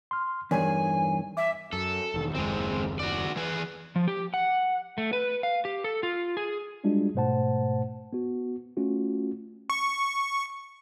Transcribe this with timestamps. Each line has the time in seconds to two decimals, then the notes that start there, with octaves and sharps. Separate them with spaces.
0.11 C6 F6
0.51 E2 G2 D#4 A#4 C#5 G#5
1.37 E5 D6
1.73 F#2 A4
2.14 E1 D#3
2.35 F#1 D#2 G#3 C4
2.99 F#4 D5
3.36 E3 G#4 B4
3.96 F3
4.08 G4
4.34 F#5
4.98 A3
5.13 B4
5.43 F5
5.65 G4
5.84 A4
6.03 F4
6.37 G#4
6.84 G3 G#3 D4 F4 F#4
7.15 G#2 B2 A3 C5 F#5 A5
8.13 B3 F#4
8.77 A3 C#4 F4 F#4
9.70 C#6